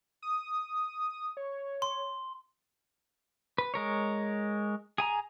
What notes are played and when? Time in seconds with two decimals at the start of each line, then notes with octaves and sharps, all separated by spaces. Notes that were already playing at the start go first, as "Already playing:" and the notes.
0.22 D#6
1.37 C#5
1.82 C6
3.58 B4
3.74 G#3 A#4 C#5
4.98 G#4 G#5 A#5